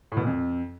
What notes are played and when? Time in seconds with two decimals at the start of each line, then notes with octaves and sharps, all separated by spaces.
0.12 A2
0.17 B2
0.22 A#2
0.27 F2